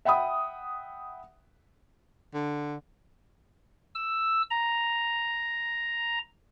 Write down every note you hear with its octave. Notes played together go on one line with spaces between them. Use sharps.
E5 F#5 G5 B5 D#6
D3
E6
A#5